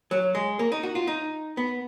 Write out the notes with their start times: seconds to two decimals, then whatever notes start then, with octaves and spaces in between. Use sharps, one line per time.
0.11 F#3
0.35 G#3
0.59 A#3
0.72 D#4
0.83 F#4
0.95 F4
1.07 D#4
1.57 B3